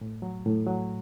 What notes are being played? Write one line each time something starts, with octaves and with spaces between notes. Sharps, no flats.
A2
F#3
A2
F#3